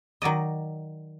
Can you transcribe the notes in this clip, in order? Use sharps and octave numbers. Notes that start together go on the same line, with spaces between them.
D#3 F#3 D5 D#5